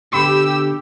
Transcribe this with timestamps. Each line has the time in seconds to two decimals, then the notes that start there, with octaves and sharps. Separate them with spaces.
0.13 B2 D3 G4 B5 E6